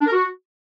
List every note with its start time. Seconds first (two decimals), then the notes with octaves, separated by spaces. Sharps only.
0.01 D4
0.07 A#4
0.12 F#4